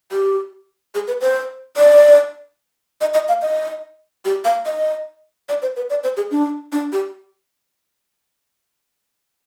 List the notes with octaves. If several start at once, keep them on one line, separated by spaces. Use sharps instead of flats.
G4
G#4
B4
C5
D5
D#5
D#5
F5
D#5
G4
F5
D#5
D5
C5
B4
D5
C5
G#4
D4
D4
G4